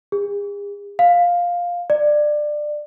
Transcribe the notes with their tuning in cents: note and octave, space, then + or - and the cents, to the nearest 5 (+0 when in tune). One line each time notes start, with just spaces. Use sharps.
G#4 -45
F5 +10
D5 +20